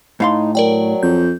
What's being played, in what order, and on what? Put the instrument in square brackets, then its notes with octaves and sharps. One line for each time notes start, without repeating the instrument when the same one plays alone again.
[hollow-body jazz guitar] A2 F5 C6 [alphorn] D#4
[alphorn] F#3 [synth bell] A#4 D5 G5
[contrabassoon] F2 [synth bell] G6